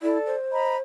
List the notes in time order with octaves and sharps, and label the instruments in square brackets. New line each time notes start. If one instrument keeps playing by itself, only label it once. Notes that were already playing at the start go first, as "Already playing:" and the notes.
[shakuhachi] E4 [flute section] A4 D5
[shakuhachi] C5
[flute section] D#5 A#5 B5